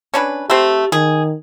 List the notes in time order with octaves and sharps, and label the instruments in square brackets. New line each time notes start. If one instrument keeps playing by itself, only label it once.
[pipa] C#4 D4 B4
[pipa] A3 C4 [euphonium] G4
[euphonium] D#3 [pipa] G#4